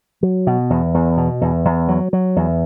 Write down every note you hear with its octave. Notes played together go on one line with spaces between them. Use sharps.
F#3
B2
E2
E2
B2
E2
E2
F#3
F#3
E2